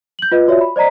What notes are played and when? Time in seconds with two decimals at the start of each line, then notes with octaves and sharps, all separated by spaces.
0.19 G6 F#7
0.32 F4 B4 D#5
0.47 F4 F#4 C#5 D5 E5
0.61 B5
0.76 C5 D5 D#5 A#5 B6